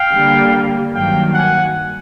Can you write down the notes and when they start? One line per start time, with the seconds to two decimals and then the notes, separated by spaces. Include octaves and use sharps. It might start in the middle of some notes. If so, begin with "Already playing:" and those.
Already playing: F5 G5
0.12 D3 G3 A#3
0.94 G2 D#3 F#3 A#3 F5 G5
1.34 F#5 G#5